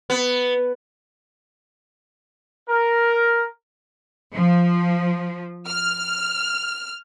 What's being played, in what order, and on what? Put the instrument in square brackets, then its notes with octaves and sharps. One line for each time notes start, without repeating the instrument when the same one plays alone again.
[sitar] B3
[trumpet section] A#4
[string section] F3
F6